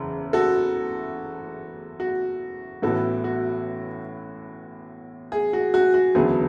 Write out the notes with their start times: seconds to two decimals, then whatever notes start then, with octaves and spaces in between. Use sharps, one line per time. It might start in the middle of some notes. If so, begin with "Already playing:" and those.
Already playing: F#1 E2 C#3
0.33 F#4 A4
2.00 F#4
2.82 A1 A2 E3 B3 F#4 A4
3.24 F#4
5.32 G#4
5.53 F#4
5.74 F#4
5.94 F#4
6.15 E1 D2 C#3 F#3 B3 G#4